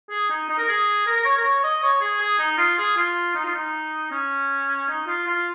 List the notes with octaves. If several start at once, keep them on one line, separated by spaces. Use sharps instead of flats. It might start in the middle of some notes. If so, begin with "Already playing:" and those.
G#4
D#4
D#4
A#4
G#4
A#4
A#4
C#5
A#4
C#5
D#5
C#5
G#4
G#4
D#4
F4
G#4
F4
D#4
F4
D#4
C#4
D#4
F4
F4